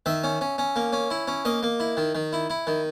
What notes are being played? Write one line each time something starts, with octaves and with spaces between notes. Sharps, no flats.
D#3 E5
C#4
C#4
C#4
A#3
C#4
E4
C#4
A#3 D#5
A#3
E4
D#3
D#3
E4
E4
D#3